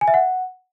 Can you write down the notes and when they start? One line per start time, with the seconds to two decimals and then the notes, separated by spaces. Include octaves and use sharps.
0.01 G#5
0.08 E5
0.14 F#5